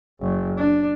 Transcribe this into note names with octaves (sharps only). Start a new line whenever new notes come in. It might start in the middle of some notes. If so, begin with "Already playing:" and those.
F#1
D4